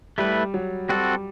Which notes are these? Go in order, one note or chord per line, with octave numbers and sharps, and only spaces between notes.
G3 A3 E4 B4
F#3
G3 C4 F#4 A4